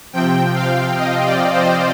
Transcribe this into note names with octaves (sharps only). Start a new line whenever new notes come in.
C3 F3 C4 G5
F5
D#5
D5
C5